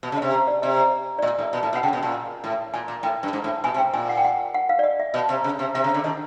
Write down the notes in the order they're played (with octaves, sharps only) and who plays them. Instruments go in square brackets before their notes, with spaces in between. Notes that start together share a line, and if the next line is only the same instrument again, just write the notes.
[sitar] B2
C#3
[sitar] C3 [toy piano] D#5
[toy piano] D5
[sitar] C3 [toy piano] D#5
[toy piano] D5
[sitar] A#2 [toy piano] D#5
[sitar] A2
B2
A2
B2
[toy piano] F#5
[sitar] C#3 [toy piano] G5
[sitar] B2
A#2
A2
[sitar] A#2 [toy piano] G#5
[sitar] A#2
[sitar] A2 [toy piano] G5
[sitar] G2
G#2
A2
[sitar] B2 [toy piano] G#5
[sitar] C3
[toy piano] G5
[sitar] A#2 [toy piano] G#5
[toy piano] F#5
G5
F#5
F#5
F5
D5
D#5
E5
[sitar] B2 [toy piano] D#5
[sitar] C3
C#3
C3
[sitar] C3 [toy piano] E5
[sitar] C#3
D3
[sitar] D#3 [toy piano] D#5